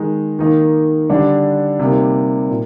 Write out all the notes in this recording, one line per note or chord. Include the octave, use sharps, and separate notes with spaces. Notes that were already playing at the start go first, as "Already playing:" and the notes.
Already playing: D#3 G#3 D#4
D#3 A#3 D#4
D3 G3 D4
C3 G3 A#3 D#4
A#2